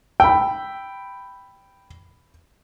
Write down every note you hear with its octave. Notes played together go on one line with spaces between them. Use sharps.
G5 B5 E6